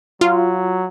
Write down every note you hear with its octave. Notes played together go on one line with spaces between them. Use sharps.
F#3 F4